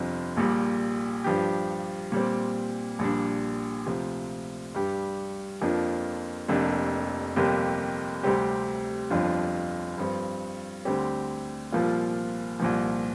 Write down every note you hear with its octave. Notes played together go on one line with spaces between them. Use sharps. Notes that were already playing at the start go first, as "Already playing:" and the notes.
Already playing: G1 F2 C3 F3 D4
A#1 A#2 G3
G2 F3 D4 G4
A#2 G3 C4
A#1 A#2 G3 D4
D2 C3 F3
G2 G3 D4 G4
F2 F3 A#3 D4 F4
F1 F2 C3 A#3 D4
G1 F2 C3 A#3 G4
D2 C3 G3 C4 G4
G1 F2 F3 D4 F4
G2 F3 C4
D2 D3 G3 C4 G4
C2 A#2 F3 A#3 F4
C2 A#2 F3